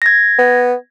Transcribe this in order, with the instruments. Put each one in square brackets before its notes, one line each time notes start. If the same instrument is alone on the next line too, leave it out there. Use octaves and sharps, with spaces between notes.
[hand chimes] G#6 A#6
[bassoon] B3